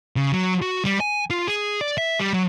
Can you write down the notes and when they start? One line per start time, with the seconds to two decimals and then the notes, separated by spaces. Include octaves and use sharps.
0.16 C#3
0.32 F#3
0.62 F#4
0.85 G3
1.00 G#5
1.30 F4
1.47 G#4
1.81 D5
1.98 E5
2.19 G3
2.33 F#3